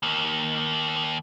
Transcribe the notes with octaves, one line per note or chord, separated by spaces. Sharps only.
D#2 A#3